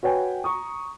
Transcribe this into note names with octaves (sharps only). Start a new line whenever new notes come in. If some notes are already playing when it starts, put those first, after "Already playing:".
F#4 B4 C#5 G5 G#5
A#5 C#6 D#6